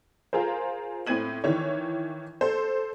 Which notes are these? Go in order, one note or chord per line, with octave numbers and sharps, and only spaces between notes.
F4 G#4 A#4 C5
A2 C4 G#6 D#7 F#7
D#3 E3 C#5
A4 C5